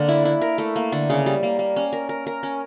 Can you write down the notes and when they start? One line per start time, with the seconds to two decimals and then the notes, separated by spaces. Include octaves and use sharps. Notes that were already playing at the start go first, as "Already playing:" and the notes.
Already playing: D3 A#3 D4 A#4
0.08 E4
0.25 E4
0.41 A#4
0.58 A3
0.76 A#3
0.92 D3
1.10 C#3
1.26 G3
1.43 A#3
1.59 A#3
1.76 C#4
1.93 A#4
2.09 A#4
2.27 A#4
2.43 C#4